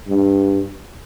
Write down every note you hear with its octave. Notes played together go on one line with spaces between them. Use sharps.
G2